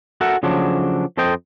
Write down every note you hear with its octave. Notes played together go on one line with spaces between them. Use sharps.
F#4 A4 A#4 E5 F#5
C#3 F3 F#3 A3 D4
F2 A4 C5 D#5 G5